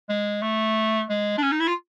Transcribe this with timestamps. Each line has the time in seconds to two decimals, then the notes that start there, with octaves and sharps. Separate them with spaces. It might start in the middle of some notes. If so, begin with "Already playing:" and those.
0.09 G#3
0.42 A3
1.10 G#3
1.38 D4
1.43 C#4
1.52 D#4
1.60 E4
1.68 F4